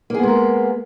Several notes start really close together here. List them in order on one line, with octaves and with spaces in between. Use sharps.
A#3 G#4 B3 G#3 A#4